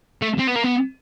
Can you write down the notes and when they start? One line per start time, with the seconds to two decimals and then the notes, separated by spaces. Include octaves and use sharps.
0.22 A3
0.39 C4
0.47 B3
0.55 A#3
0.64 B3